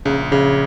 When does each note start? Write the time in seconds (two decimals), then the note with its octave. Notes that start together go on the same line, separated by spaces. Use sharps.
0.05 A#1 C#3
0.31 A#1 C#3